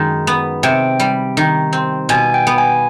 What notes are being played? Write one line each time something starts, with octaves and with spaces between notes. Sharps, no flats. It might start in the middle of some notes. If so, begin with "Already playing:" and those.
Already playing: F#2 D#3 G#3
B3
C3 G5
G3
D#3
C4
B2 G#5
G5
B3
G#5